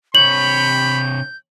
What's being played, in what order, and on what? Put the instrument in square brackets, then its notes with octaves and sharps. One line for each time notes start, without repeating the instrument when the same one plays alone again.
[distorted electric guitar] C3 C#5 [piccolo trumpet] B5 [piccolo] G6 [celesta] F#7